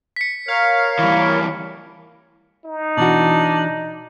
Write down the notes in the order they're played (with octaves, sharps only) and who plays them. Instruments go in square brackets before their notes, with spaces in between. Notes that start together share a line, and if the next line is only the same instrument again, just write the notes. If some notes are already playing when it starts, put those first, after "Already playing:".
[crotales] B6 C#7
[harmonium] A#4 C#5 [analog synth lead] F5
[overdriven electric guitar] E3 G3
[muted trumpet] D#4
[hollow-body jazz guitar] B2 E3 F#4 [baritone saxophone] D4